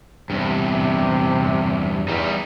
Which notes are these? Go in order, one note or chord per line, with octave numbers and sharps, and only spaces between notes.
E2 G2 C3
E2 G3 D#4